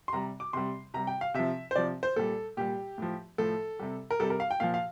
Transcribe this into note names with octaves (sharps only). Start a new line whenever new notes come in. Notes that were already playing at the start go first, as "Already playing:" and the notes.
C6
C3 G3 A#5
D6
C3 G3 C6
C3 G3 A#5
G5
F5
C3 F3 E5
C5
C3 F3 D5
C5
A#2 G3 A4
A#2 G3 G4
A2 F3
A2 F3 A4
C3 G3
A#4
C3 G3 A4
A#4
F5
G5
A#2 F3 F5
F5